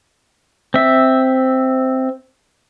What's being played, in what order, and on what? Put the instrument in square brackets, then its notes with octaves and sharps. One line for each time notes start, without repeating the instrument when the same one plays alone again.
[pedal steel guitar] C4 E5